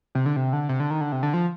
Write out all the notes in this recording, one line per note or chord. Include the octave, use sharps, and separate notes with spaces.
C3
D3
C3
D3
C3
D3
D#3
D3
C3
D3
F3